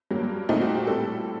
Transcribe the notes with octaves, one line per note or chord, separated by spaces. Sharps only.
G2 F#3 A#3
A#2 A3 C4 D#4
F#4
G4
A2 G3 C4 A4